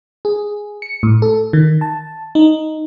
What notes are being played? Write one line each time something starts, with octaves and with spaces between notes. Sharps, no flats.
G#4
C#7
A2
A4
D#3
A5
D#4